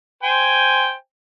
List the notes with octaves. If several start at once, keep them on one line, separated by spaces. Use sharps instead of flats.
C5 G5 G#5